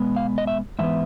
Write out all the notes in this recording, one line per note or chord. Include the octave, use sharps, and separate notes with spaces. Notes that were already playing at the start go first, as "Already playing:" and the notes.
Already playing: B2 G#3 B3
F5
D#5
E5
G#2 E3 B3 E5